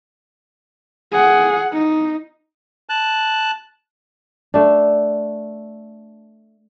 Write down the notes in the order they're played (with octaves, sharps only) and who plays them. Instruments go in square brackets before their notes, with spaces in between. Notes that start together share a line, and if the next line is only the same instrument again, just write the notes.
[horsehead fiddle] G#4 F#5
D#4
[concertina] A5 F#6
[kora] A3 D4